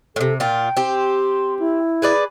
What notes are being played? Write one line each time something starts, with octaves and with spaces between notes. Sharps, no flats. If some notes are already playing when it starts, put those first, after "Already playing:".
A2 C3 A4
A#2 F4 G5
C4 G4
C6
E4
G#4 B4 D5